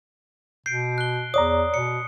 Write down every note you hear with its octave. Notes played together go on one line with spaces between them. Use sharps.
B2 G6 C7 D7
F#6 G7
E2 C#5 D5 A#5 D#6
B2 C#7